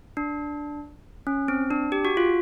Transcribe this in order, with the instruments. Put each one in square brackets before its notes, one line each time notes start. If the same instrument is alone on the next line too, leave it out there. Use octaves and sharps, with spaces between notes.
[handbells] D4
C#4
C4
D4
G4
F#4
F4